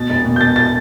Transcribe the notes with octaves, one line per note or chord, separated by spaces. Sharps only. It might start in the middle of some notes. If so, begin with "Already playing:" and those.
Already playing: B2 A6
E1
B2
G6
B2 A6
A6